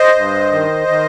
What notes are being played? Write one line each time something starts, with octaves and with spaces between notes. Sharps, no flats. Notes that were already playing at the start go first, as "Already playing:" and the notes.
Already playing: C5 D#5
G2
D#3
D#3